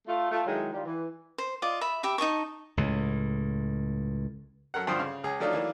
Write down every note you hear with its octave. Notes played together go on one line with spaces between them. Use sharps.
A3 F4
A3 F4
D#3 F#3 G#3 E4
D#3 G3 F4
E3
C5
F4 D5 D#5
E5 B5
G4 E5 B5
D#4 D#5 A5 C#6
C#2 A2
F#2 A4 A#4 F#5
G2 D3 F3 C5 G5 D#6
C#3
C#2 G#4
F3 F#3 A3 D4 D#4 F4
E3 F#3 A#3 D4